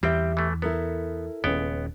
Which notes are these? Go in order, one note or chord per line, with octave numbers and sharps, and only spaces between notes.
E2 G3 C4 G4 E5 G5
E3 A3
B3 E4 A4 A#4
D#1 C#2 B3 C#4 G5